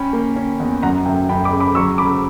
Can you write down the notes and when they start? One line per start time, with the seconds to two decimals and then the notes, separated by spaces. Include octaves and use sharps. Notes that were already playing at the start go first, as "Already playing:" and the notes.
Already playing: C#4 G5 B5
0.13 A#3
0.36 C#4
0.60 E2
0.82 F#2 F#5 A#5
1.06 F#2 E5 G5
1.29 F#2 G5 B5
1.44 B5 D6
1.52 C#3
1.60 B5 D6
1.75 F#3 C#6 E6
1.98 C#3 B5 D6